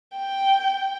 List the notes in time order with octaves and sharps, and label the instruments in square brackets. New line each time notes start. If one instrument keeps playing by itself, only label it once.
[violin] G5